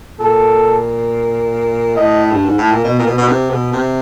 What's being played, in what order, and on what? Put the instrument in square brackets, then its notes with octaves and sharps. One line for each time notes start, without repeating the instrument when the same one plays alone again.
[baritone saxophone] A#2 [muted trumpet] A4
[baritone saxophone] A2 [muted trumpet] D#5
[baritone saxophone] G2
G#2
A2
A#2
B2
A#2
B2
B2
C3
B2
C3